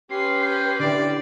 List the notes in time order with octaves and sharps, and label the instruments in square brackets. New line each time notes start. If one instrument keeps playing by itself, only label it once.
[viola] C#4 B4 [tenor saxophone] G4 [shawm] C6
[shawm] C5
[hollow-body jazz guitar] D3 E4 [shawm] D5